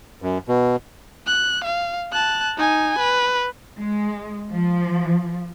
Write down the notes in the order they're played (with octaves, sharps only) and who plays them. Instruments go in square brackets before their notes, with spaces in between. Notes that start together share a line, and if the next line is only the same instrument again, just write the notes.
[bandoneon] F#2
B2
[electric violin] F#6
F5
A5 F#6
D#4 G#5
B4
[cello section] G#3
F3